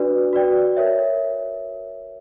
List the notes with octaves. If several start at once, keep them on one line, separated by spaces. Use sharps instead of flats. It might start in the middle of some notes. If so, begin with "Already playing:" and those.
Already playing: D4 F#4 B4 D5
F#4 B4 D5 G5
A#4 C#5 E5